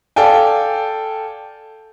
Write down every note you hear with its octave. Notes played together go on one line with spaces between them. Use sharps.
A4 D5 F5 G5 G#5